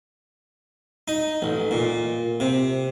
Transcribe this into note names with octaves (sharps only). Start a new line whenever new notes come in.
D#4
A1
A#2
C3